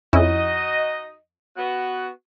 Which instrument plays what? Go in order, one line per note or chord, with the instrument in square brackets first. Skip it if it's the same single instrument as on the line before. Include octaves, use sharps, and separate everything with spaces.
[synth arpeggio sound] F2 C#4 E4 [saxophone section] D#4 F#4 D#5
[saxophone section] B3 F#4